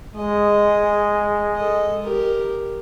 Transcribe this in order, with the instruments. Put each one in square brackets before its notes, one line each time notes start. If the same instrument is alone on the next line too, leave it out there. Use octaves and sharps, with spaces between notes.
[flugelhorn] G#3 [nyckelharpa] D#5
[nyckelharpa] A4 D#5
G4 A#4